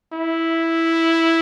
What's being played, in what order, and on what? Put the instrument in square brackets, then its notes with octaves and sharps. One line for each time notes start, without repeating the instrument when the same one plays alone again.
[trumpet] E4